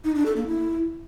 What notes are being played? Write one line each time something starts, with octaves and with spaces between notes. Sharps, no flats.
D#4
D4
A4
A#3
E4